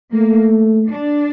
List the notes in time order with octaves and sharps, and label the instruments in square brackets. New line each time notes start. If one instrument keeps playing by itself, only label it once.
[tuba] A3 [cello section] A#3
[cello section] D4